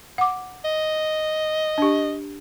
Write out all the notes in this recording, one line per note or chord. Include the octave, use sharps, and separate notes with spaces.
F#5 D6
D#5
D4 G4